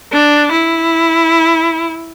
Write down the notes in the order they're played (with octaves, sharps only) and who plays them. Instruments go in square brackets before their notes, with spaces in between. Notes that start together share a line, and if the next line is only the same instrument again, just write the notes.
[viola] D4
E4